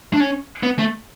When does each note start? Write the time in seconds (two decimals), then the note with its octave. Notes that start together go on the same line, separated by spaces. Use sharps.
0.14 D4
0.20 C#4
0.63 B3
0.79 A3